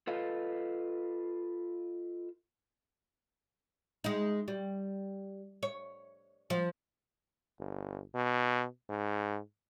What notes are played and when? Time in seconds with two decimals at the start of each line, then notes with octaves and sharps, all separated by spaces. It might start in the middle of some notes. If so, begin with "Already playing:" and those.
0.07 F4 A4 B4 D#5 F5
4.04 G#3 D#4
4.48 G3
5.63 C#5
6.50 F3
7.59 G1
8.15 B2
8.89 G#2